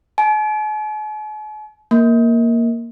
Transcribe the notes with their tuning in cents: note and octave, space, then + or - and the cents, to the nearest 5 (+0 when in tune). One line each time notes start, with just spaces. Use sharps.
G#5 +45
A#3 +0